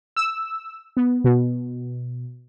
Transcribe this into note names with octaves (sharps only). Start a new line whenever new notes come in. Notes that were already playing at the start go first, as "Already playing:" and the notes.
E6
B3
B2